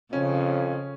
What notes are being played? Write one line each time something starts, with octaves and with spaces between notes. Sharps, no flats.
F2 C#3 C#4